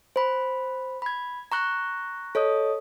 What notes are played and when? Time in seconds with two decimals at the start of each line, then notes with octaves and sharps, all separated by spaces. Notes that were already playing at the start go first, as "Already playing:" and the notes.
0.16 C5 B5
1.02 B5 G#6
1.52 A#5 C#6 F#6 A#6
2.35 A4 C#5 D#5 D#6